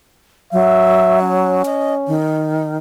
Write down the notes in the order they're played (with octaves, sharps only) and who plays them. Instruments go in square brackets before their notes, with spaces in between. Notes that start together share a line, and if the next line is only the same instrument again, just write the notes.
[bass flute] F#3 [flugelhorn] E5
[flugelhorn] C#4
[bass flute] D#5
D#3